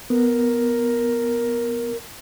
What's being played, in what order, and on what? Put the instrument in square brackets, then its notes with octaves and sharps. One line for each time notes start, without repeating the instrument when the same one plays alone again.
[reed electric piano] B3 [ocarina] A#4